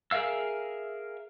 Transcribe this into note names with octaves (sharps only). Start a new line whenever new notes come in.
G#4 A#4 E5 F5 E6